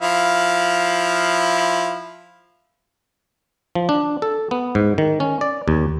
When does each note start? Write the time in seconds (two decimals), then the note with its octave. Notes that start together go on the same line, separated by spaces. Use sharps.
0.01 F3 E4 F5
3.75 F3
3.89 D4
4.22 A4
4.51 B3
4.75 G#2
4.98 D#3
5.20 C#4
5.41 D5
5.68 D#2